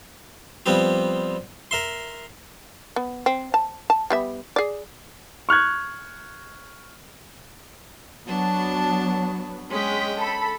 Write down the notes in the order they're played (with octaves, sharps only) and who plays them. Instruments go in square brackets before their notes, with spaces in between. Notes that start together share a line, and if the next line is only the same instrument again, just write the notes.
[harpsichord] F3 G3 B3 C4 G4
A#4 E5 C6
[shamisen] B3
C4
A5
A5
G3 B3 E5
G#4 D5
[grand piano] C#6 F6 F#6 G#6
[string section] F#3 B3 [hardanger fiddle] D4 A5
[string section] G#3 B6 [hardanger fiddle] C#4 G5
[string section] A4 B5